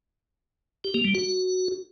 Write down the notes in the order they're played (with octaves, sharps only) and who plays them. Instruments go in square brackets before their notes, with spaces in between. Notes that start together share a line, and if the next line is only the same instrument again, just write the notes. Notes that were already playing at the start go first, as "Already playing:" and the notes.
[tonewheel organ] G4
A#3
G3
F#4